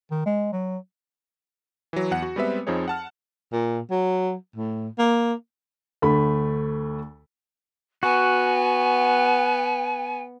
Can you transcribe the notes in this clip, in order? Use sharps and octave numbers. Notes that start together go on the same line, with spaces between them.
D#3
G#3
F#3
E3 F#3
E2 F#5 C#7
F#4
G3 G#3 B3 C4 B4 E5
F2 F3 C4 D#4 G#4 C#5
F#5 A5 F6
A#2
F#3
A2
A#3
D2 A3 B5
B3 F#4 G#5